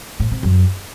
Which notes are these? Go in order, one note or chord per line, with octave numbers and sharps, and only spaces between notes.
A2
C3
F#2